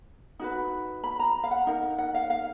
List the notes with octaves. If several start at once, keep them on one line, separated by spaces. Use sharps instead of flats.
D#4 F#4 B4
B5
A#5
F5
F#5
D#4 A#4
F#5
F5
F5